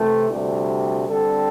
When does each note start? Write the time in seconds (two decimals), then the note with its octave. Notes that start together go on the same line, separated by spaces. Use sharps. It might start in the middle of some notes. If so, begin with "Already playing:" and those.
Already playing: C3 E3 A3
0.29 D2 C3 G3
1.07 D3 G3 C4 A4